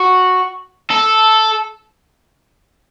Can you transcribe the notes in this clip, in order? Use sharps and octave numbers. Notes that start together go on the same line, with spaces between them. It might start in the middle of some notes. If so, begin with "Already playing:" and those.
Already playing: F#4
A4